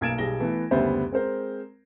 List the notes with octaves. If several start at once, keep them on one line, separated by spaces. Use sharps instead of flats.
B1 A#3 G#6 A6 D7 E7
B1 G3 G#4 A#6 G7
E3 A3 B3
F#1 D2 G3 B3 C5 E5
G#3 C4 A#4 C5